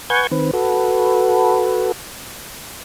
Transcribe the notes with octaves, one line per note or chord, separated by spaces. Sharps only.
B4 F#5 G#5 C#6 G6 G#6
D#3 C4 B4
F#4 A4 B4